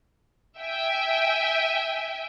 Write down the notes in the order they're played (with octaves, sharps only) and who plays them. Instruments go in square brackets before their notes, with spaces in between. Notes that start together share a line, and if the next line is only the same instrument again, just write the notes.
[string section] E5 G5 G#5